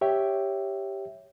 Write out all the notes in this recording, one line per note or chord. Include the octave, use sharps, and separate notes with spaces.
G4 C#5 E5 G5